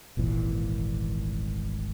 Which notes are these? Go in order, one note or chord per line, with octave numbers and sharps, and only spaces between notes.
D#1 G#1 A#2 E3